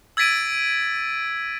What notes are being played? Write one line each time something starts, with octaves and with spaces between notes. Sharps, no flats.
E6 G#6 A6 B6 D7 D#7